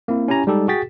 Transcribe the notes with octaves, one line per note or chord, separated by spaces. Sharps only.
A#3 C4 E4
C#4 E4 G4 G#5 A#5
G3 G#3 D#4 G4 A4
F#4 G#4 G5 A6 B6